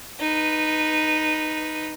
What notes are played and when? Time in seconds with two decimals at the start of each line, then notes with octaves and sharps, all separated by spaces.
0.20 D#4 B4